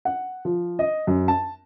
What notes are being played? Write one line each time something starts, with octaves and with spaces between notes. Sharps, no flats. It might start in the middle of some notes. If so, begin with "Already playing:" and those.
F#5
F3
D#5
F#2
A5